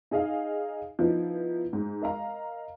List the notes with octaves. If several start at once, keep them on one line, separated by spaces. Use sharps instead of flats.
D#4 G#4 D#5 F5
F3 B3 D#4 E4
G#2
A#4 D#5 F5 A#5